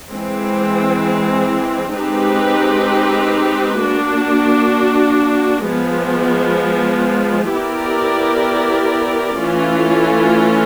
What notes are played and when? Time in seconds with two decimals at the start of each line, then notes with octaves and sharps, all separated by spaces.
0.11 E3 G#3 C4
1.96 G#3 C4 D#4 G4 B4
3.82 A#3 D4 F#4
5.68 F3 G#3 B3
7.54 B3 E4 G4 A#4 D5
9.40 E3 A3 C#4 F4